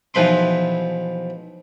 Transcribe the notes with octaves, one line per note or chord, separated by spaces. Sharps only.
B1 E3 F3 B5 C6